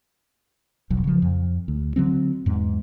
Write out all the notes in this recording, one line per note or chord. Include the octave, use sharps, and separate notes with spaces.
E1 B1 F#3
C#3 F3
F2
D2
D3 F#3 C4
E2 G#2